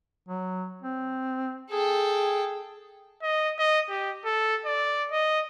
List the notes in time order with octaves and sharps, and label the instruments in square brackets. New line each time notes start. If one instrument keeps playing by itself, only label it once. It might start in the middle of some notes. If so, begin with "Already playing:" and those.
[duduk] F#3
C4
[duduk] G#4 [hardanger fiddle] A4 G5
[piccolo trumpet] D#5
D#5
G4
A4
D5
D#5